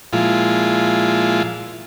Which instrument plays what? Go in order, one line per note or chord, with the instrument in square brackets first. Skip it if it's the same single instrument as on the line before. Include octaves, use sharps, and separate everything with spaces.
[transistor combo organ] A#2 F3 G#3 E4 F4